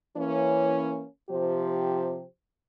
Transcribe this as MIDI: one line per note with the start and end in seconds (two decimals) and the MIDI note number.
0.17 1.05 52
0.17 1.05 58
0.17 1.05 61
1.30 2.25 48
1.30 2.25 53
1.30 2.25 67
1.30 2.25 72